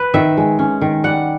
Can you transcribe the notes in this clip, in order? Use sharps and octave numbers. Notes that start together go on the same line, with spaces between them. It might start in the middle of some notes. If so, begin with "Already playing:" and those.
Already playing: B4
D#3 E5
G#3
C#4
D#3
G3 F#5